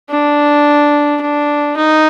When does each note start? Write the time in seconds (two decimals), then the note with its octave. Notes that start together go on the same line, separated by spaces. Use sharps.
0.10 D4
1.21 D4
1.77 D#4